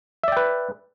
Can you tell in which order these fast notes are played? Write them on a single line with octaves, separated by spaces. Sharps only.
E5 D5 G5 B4